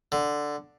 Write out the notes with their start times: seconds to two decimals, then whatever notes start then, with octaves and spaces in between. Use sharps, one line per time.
0.12 D3